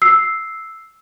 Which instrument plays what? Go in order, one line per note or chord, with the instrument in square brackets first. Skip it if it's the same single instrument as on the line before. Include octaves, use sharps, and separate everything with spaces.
[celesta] E6 C7